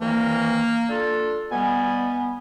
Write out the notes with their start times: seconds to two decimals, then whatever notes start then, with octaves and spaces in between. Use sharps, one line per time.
0.01 C2 D#3 E3 A#3
0.89 D4 F4 A4
1.52 B2 G3 B3 G#5